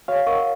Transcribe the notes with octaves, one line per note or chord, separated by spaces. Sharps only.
F#4 C#5 F5
A#4 D#5 F#5 C#6